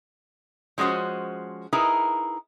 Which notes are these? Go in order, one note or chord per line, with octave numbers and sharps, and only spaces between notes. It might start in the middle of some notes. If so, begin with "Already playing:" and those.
F3 G#3 C#4 F#4 C5
D#4 E4 G#4 A#4 B4